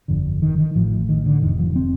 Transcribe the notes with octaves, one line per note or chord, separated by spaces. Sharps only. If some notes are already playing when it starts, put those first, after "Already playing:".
G1 F2 D3
D#3
D#3
A1 A2 F3
D#3
D3
F1 F2 C3 D#3
F3
C4